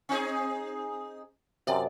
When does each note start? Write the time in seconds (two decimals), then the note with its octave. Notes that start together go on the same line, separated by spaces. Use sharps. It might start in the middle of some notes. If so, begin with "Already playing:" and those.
0.09 C4 D#4 G#4
1.67 F#2 C3 D5